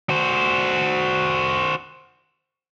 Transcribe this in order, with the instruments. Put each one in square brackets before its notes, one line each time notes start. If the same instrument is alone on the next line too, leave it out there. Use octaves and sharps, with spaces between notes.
[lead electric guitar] F#4 C5